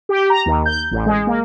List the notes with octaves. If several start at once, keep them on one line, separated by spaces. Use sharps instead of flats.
G4
A#5
D#2
G6
A1
G#3
A#3